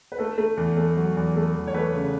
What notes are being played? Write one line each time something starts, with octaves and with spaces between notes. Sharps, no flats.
B4
A3 A4
A3
E2
A3
F#3
E2
A3
E2
C#5
A3 B4
C#3